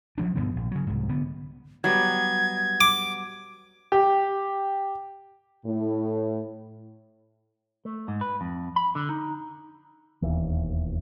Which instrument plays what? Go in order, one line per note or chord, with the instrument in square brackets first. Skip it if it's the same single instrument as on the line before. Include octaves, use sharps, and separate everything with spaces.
[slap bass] F3 F#3 D4
D2 G2 B2 B3
A#1
C#3 F#3
C2 G#2
D3 B3
[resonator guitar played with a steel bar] F#3 G3 B3 [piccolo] G#6
[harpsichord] D6
[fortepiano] G4
[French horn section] A2
[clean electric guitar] A3
G#2
B4
F2
B5
D3
D#4
[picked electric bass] E1 D#2 E3